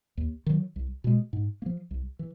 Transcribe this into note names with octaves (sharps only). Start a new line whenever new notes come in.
D#2
D#3 F#3
C2
B2 G#3
G#2
A#3
F3
C2
E3